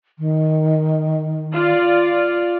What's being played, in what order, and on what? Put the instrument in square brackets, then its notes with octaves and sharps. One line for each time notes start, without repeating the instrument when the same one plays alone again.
[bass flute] D#3
[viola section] F4 D5